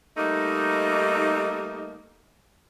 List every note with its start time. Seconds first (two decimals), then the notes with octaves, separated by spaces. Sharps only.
0.17 G3 A3 A#3 D#4